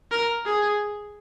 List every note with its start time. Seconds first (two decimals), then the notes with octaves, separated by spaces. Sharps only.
0.11 A#4
0.46 G#4